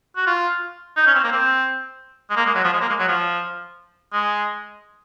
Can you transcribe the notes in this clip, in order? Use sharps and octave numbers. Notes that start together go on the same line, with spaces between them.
F#4
F4
D#4
C#4
C4
A#3
C4
G#3
A#3
G#3
F#3
F3
G#3
A#3
G#3
F#3
F3
G#3